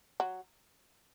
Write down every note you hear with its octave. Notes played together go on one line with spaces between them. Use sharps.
F#3